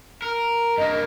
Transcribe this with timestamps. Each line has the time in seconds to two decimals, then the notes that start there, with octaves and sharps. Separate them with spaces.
0.22 A#4
0.78 G2 A#3 D#5